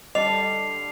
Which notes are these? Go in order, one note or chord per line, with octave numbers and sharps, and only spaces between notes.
D3 G3 D#5 D6 C7 F7